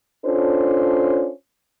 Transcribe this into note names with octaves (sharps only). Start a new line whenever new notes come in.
C#4 D4 F4 A4 C5 C#5